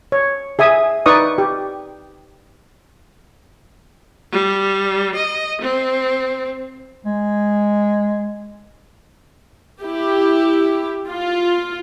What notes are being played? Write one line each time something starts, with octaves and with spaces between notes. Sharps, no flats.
C#5
G#4 E5 G#5 D#6
D#4 B4 D5 C#6 D#6
G4
G3
D#5
C4
G#3
E4 G4
F4